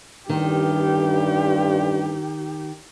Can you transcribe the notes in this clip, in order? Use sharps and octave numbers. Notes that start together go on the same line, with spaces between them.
A1 G2 D#3 G4